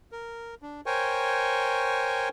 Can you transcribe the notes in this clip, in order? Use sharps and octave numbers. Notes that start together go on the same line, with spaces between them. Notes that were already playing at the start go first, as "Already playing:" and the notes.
A#4
D4
A#4 C5 C#5 G5 G#5 C#6